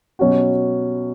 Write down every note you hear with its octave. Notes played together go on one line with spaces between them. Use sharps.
B2 F#3 C#4 F#4